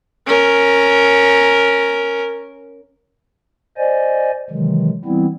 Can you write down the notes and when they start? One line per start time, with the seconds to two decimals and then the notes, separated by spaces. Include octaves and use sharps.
0.27 C#4 A#4
3.77 C5 D5 D#5 G#5
4.50 C3 D#3 E3 F#3 G#3
5.05 E3 G3 B3 C4 E4